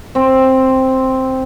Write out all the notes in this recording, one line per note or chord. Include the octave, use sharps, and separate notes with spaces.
C4